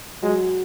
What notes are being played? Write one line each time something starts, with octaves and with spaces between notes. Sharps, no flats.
F#3 G#3